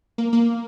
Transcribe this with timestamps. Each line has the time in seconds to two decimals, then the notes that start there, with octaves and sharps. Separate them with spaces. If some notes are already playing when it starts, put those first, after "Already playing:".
0.18 A#3
0.33 A#3